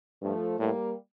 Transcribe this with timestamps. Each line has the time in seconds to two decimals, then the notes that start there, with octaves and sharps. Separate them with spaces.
0.22 G2 F3 A3
0.59 A2 G3 A#3